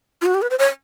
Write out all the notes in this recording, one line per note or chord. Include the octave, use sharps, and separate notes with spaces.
F4
F#4
G4
B4
C5
C#5